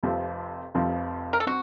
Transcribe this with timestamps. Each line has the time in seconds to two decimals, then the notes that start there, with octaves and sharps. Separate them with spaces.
0.03 F1 F2 C3 F3 C4
0.74 F1 F2 C3 F3 C4
1.33 A#4
1.40 A4
1.47 C4 F#4